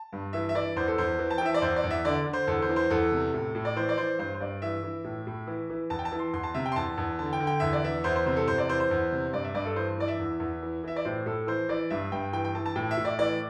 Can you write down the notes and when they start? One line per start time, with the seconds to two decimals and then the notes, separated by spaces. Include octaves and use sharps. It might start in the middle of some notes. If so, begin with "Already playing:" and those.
Already playing: A5
0.12 G2
0.33 E3 E5
0.49 E5
0.55 E3 D5
0.76 E2 C5
0.88 A4
0.98 E2 C5
1.19 E3
1.30 A5
1.38 G5
1.41 E3 E5
1.54 D5
1.62 E2 C5
1.76 D5
1.84 E2
1.90 E5
2.05 D3 D5
2.26 D3
2.33 C5
2.47 E2 A4
2.62 C5
2.69 E3
2.76 C5
2.90 E2 A4
3.12 C3
3.34 A2
3.55 A2
3.65 D5
3.76 E3 C5
3.89 D5
3.97 E3 C5
4.18 G2 C5
4.34 C5
4.41 G2 D5
4.62 E3 E5
4.83 E3
5.04 A2
5.27 A2
5.47 E3
5.70 E3
5.90 E2 A5
5.99 G5
6.05 A5
6.12 E3
6.19 C6
6.33 E2 C6
6.43 A5
6.54 C3 E5
6.66 G5
6.72 C6
6.76 E2 A5
6.97 E2
7.19 D3 A5
7.33 G5
7.40 D3
7.47 G5
7.60 E2 E5
7.73 D5
7.84 E3 E5
8.04 E2 C5
8.16 C5
8.26 C3 C5
8.37 A4
8.48 E2 C5
8.58 D5
8.69 E3 C5
8.80 C5
8.91 E2
9.12 C3
9.33 G2 D5
9.44 E5
9.54 G2 D5
9.66 A4
9.76 E3 C5
9.98 E3 D5
10.08 E5
10.19 E2
10.40 E2
10.62 E3
10.84 E3 E5
10.96 D5
11.05 A2 C5
11.26 A2 A4
11.47 E3 C5
11.69 E3 D5
11.90 G2 E5
12.12 G2 G5
12.33 E3 G5
12.44 G5
12.55 E3 A5
12.66 A5
12.76 A2 G5
12.91 E5
12.97 A2
13.05 D5
13.19 E3 D5